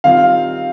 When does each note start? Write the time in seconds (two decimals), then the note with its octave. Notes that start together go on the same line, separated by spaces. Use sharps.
0.04 D#3 G3 C4 F4 F5